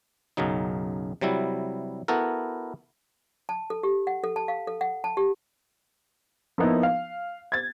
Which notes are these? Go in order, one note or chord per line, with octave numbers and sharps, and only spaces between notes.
B1 F#2 C#3 F#3 D#4
C3 F#3 G3 E4
B3 E4 F#4 A4 A#4
A5
A4
G4
F#5
A4
A5
F5
A4
F#5
A5
G4
F3 A#3 B3 D#4 E4
F5
G#6 A6